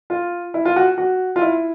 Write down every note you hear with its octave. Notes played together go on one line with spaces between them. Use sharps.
F4
E4
F4
F#4
F#4
F4
E4